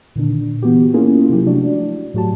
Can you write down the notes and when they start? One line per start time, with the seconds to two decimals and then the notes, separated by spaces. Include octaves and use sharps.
0.16 A#2 D3 D#3 D4
0.62 E3 B3 F#4 G4
0.94 A#3 C#4 E4 F4 G#4 A#4
1.29 C3 F3 F#3 E4 G4
1.46 A3 D4 F#4 D5
2.14 A2 F#3 A3 F#4 G4 A5